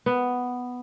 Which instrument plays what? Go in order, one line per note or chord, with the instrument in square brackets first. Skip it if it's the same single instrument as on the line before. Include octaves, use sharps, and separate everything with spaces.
[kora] B3